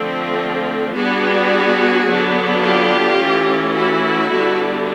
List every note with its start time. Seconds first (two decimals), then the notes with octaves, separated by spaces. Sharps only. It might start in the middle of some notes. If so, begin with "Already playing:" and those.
Already playing: D3 F3 A3 C4
0.95 G3 B3 D4 F#4 G#4
2.07 D3 F#3 B3 D4
2.63 F4 G4
3.19 E3 A3 C#4
3.75 E4 F#4
4.31 D3 G3 B3 D4